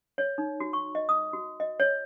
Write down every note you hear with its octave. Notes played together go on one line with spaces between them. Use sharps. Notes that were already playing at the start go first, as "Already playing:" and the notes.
C#5
D#4
F#4
C#6
D#5
D#6
F#4
D#5
C#5